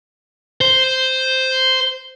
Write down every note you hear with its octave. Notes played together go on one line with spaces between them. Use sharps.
C5